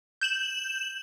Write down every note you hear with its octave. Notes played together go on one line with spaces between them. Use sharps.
G6 E7 F#7